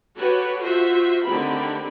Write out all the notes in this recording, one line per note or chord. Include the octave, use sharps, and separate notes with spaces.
F#4 G4 A4 B4 C#5
F4 F#4 C5 E5
D3 D#3 A3 C4 G4 B5